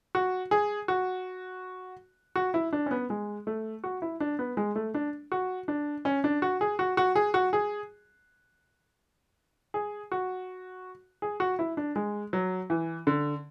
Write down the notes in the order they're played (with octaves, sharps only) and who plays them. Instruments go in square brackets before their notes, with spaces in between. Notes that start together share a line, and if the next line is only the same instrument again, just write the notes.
[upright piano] F#4
G#4
F#4
F#4
E4
D4
C#4
B3
G#3
A3
F#4
E4
D4
B3
G#3
A3
D4
F#4
D4
C#4
D4
F#4
G#4
F#4
F#4
G#4
F#4
G#4
G#4
F#4
G#4
F#4
E4
D4
G#3
F#3
E3
D3